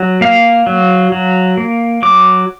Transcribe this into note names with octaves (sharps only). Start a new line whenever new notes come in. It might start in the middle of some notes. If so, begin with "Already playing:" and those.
Already playing: F#3
A#3 F5
F#3
F#3
A#3
F#3 D6